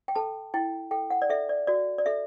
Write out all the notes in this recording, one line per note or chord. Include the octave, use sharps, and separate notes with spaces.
G5
A4 A5
E4 G5
A4 G5
F#5
D5
A4 E5
D5
F#4 D5
D5
A4 E5